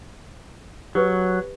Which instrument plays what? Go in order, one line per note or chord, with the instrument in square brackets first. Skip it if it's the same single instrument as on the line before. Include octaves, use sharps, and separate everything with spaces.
[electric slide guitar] F#3 [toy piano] G4 B4